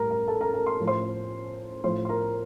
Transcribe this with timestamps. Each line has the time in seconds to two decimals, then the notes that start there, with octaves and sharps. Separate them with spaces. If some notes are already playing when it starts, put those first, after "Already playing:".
Already playing: A2 G3 A#4 A#5
0.10 A#4 A#5
0.28 A4 A5
0.41 A#4 A#5
0.54 A#4 A#5
0.66 C6
0.80 A2 F3
0.87 C5 C6
1.84 A2 F3 C5 C6
2.05 C6
2.09 A#4 A#5